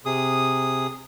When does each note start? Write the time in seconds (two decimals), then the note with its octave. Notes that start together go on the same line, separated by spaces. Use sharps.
0.05 C3 G#4 D#6